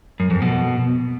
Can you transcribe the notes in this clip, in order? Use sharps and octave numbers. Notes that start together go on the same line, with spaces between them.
F#2
F2
B2